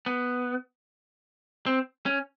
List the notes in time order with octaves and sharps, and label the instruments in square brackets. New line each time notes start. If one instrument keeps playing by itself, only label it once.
[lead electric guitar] B3
C4
C#4